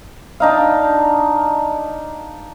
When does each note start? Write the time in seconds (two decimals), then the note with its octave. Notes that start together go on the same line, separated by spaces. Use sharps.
0.40 D4 D#4 F5